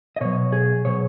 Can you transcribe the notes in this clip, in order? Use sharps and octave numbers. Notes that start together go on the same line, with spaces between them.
D#5
B2 F#3 C#5
G#4
B2 F#3 C#5